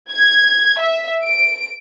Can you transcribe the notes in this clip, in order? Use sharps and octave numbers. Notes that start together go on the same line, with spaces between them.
G#6
E5
D7